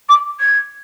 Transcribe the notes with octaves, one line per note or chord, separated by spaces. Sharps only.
D6
G#6